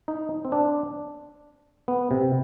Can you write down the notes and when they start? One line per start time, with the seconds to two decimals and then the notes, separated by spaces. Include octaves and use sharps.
0.08 D#4
0.45 C4
0.52 D4
1.88 B3
2.11 C3